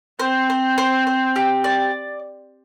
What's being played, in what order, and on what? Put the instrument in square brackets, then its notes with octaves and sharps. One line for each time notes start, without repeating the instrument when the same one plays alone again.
[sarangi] C4 [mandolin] C5
[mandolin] C5
C5
C5
G4
D5